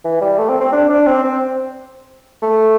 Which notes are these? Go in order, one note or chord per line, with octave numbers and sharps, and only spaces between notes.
E3
G3
A3
C4
C4
D4
D4
C4
C4
A3